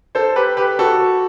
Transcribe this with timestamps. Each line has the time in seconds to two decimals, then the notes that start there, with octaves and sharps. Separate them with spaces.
0.15 A4 C5
0.36 G4 B4
0.57 G4 B4
0.79 F#4 A4